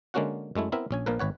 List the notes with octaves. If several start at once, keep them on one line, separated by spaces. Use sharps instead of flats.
D3 G#3 A#3 C#4 F#4 F#5
F#2 G#3 A3 E4
B3 C4 E4 A#4 E5
A#1 C#4 G#5
A#1 A#2 F3 A#4 B4
G#1 B4 C#5 F#5